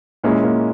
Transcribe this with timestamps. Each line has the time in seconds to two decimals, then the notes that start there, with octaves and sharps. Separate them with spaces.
0.24 A#2 G#3 A#3 C#4 E4
0.43 A#3